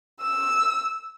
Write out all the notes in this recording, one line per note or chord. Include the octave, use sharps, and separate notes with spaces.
E6